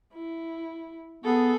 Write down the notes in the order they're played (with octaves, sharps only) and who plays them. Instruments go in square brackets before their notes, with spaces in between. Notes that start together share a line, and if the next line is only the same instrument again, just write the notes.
[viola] E4
[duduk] B3 [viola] G#4 A4